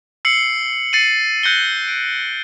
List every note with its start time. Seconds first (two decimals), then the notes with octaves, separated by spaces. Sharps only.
0.25 E6 C7 C#7 F#7
0.93 A6 C7 C#7 D#7 F#7
1.43 F#6 G6 A#6 C#7 G7
1.88 D7